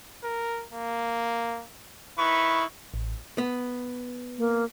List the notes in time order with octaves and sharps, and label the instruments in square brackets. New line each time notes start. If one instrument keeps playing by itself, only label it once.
[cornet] A#4
A#3
[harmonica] D#3 B4 C#6 [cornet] E4
[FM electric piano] A1
[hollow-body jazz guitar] B3
[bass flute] A#3